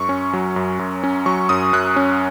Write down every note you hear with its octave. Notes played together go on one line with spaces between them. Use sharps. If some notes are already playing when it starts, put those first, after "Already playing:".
Already playing: F#2 C#6
C#4
F#3
F#2
F#2
C#4
F#3 C#6
F#2 D#6
F#2 F#6
C#4